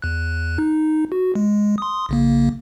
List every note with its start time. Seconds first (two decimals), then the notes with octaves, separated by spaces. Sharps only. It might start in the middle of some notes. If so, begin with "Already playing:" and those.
0.02 E2 F#6
0.58 D#4
1.12 F#4
1.35 G#3
1.78 C6 D#6
2.09 A#1 C#3 A#3